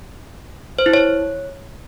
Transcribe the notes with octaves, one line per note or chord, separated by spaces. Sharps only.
C5
E4
C#5